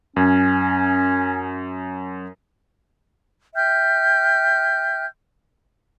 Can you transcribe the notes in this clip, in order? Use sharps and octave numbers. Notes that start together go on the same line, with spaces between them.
F#2 C#4
E5 G5 F6 G6